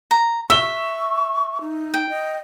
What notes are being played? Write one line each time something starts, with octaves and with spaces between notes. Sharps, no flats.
A#5
E5 C#6 E6 G7
D#4
G5
D#5